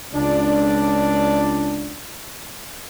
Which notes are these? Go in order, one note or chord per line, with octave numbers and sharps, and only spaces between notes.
C#2 D4